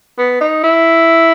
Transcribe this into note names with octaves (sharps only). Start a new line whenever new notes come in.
B3
D#4
E4